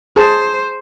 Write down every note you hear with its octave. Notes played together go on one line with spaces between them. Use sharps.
G#4 C5 A5